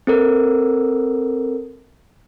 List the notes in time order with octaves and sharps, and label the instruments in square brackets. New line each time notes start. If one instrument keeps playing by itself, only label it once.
[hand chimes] C4 A4 A#4